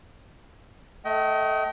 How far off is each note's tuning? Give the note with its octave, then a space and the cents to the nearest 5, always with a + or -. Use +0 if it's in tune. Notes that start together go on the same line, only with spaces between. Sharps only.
A3 +0 D#5 +25 G5 -35